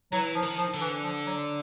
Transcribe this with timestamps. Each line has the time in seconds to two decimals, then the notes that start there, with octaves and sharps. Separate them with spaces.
0.12 E3 F#3
0.35 F3
0.43 D#3
0.58 F3
0.74 D3
0.81 E3
1.03 F3
1.26 F#3